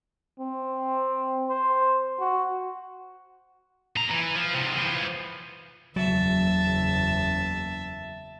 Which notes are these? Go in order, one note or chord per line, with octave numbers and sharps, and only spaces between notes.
C4
C5
F#4
A#2 A#5
E3
F3
G#2 C3
E3 F3
F#1 E2 F#3 E5 A5